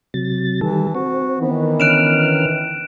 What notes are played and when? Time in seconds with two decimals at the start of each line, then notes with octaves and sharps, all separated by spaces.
0.14 C3 F#3 A6
0.61 D#3 E3 G3 A4
0.95 C4 F#4
1.41 D#3 E3 B3
1.80 D3 C#4 F6 F#6 D7 E7